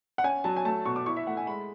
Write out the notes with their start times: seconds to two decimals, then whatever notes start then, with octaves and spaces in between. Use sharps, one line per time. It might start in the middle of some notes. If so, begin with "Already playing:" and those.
0.18 F#5
0.24 C#4 G#5
0.44 F#3 A5
0.56 G#5
0.65 A3 A5
0.85 B2 C#6
0.96 D6
1.06 E4 C#6
1.16 E5
1.27 A3 F#5
1.37 G#5
1.47 G#3 B5